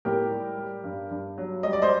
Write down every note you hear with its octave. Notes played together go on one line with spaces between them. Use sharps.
A2 G4 A#4
G3
G3
G2
G2
F#3
G3 D#5
D5
C5 D#5